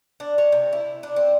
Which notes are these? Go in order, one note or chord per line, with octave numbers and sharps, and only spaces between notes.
D4
C#5
C3
E4
D4
C4